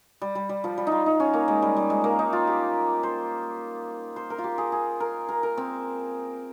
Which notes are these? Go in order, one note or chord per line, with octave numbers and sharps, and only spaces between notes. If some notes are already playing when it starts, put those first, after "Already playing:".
G3
G3
G3
F3
G3
D#4 F4
D#4
C#4
A#3
G#3
G3
G3
G#3
A#3
D#4
F4
G4
C5
C5
A#4
F4
G4
G#4
G#4
A#4
A#4
A#4
C4